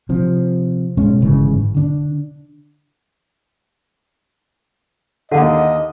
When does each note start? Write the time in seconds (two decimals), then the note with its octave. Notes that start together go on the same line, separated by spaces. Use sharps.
0.09 C3 F3
0.97 B2 G#3 C#4
1.21 G1 G#2 C#3 E3
1.74 D3 D4
5.31 D#2 D3 D#5 F5 F#5 A5